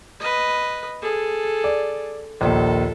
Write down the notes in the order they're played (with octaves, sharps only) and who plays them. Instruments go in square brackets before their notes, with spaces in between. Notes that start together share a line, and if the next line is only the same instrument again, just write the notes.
[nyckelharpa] B4 D#5
G#4 A4
[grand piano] D5
[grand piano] A#1 D#2 [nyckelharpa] A4